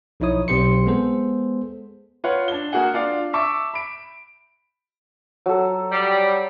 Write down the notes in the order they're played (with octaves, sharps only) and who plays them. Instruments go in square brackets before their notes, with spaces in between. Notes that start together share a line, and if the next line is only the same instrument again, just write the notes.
[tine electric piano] B1 F3 D#4 E4 C#5 D#6
B1 C4 G4 C5 C6 C#7
G#3 B3 G#4 A4 C5
[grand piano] F4 B4 C#5 F#5
D4 G7
A#3 F#4 G#4 F#5 G#5
D4 F4 D5 F5
E5 A5 C#6 D6 E6
B5 D7
[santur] F#3 A4
[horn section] G3